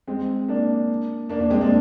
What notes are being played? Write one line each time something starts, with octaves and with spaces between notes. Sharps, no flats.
G#3 C4
A#3 D4
A#3 D4
A#3 D4
G#3 C4
A#3 D4